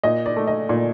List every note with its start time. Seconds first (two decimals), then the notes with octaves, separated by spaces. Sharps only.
0.04 A#2 D#5
0.26 D5
0.36 A3
0.47 D#5
0.69 A#2 D5